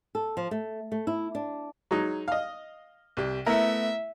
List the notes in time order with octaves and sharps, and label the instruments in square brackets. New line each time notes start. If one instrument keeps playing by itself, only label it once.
[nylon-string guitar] A4
F3
A3
A3
E4
D4
[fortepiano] F#3 G#3 D#4
D#5 F5
[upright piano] C2 G4
[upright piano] A3 B3 [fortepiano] E4 A#4 [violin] E5